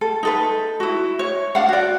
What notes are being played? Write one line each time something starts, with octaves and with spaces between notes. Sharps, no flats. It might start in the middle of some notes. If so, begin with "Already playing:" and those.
A4
D#4 A4 B4
E4 F#4
C#5
D4 F5 F#5
F#4 D5